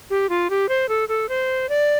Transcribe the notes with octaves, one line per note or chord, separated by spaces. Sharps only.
G4
F4
G4
C5
A4
A4
C5
D5